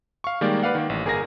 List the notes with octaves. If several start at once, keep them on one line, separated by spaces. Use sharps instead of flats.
F5 C#6
D#3 G3 G#3 A#3 D5
B4 D5 F5 F#5
D#3 A#3
A1
G1 G#4 A#4 G#5 A#6